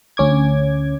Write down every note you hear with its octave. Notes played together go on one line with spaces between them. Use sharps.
D2 C#4 D6 G#6